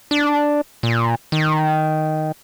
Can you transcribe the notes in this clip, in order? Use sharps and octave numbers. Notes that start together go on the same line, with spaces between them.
D4
A#2
D#3